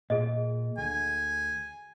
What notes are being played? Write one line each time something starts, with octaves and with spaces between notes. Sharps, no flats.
A#2 G#4 D#5
D2 G#5